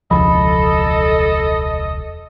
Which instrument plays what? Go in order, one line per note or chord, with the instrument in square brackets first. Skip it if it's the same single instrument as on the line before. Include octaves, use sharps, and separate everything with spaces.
[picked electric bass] E1 C#2 F3 [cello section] A4 [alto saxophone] D#5 [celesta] B5